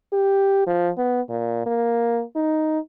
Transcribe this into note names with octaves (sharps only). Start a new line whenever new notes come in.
G4
F3
B3
A#2
A#3
D#4